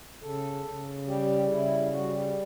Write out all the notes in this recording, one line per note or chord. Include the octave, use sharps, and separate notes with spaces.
C#3 A4
C#3
G3 G4
C#3 E4
G3 F#4
G4